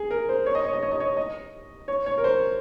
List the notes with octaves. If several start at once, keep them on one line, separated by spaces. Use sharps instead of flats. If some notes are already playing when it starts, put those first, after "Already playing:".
Already playing: G#4
A#4
C5
C#5
D#5
C#5
D#5
C#5
D#5
C#5
D#5
C#5
C#5
A#4
C5